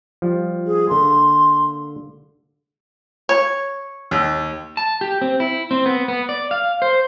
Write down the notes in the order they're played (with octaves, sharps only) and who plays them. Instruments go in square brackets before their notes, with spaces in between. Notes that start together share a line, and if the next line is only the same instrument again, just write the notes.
[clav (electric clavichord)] F3 G3
[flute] G#4
[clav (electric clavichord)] D3 A#3 [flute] C6
[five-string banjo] C#5
[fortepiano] D#2
[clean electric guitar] A5
G4
C4
E4
C4
B3
B3
D5
F5
C5